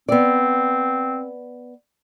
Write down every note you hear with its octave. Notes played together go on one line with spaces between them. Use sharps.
B3 C4 D5